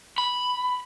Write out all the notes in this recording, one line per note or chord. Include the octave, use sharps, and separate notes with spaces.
B5